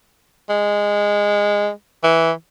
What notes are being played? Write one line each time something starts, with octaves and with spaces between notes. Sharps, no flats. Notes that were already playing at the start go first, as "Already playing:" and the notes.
G#3
E3